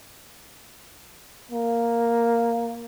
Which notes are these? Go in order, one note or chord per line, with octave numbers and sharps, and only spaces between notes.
A#3